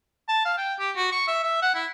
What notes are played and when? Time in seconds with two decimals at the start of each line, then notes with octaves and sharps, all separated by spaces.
0.29 A5
0.45 F5
0.58 G5
0.80 G4
0.96 F#4
1.12 C#6
1.28 E5
1.44 E5
1.62 F#5
1.75 E4